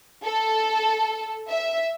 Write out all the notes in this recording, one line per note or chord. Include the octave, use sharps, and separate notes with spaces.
A4
E5